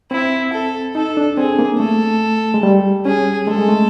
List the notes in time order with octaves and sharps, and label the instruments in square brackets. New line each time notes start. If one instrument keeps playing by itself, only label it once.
[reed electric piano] C4 [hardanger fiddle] E4
[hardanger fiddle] A4
[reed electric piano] D#4 [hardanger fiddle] A4
[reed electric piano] D4
[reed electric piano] C4 [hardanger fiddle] G#4
[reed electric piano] A#3
[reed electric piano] A3 [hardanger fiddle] A4
[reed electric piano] G#3
G3
[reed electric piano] C#4 [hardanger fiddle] G#4
[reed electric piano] G#3 [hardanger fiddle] A4
[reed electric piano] G#3
A3